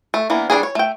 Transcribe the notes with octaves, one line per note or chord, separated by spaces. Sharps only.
A3
E3 A#3 B3 D4
G3 D4 D#4 G#4
C#5
A3 G5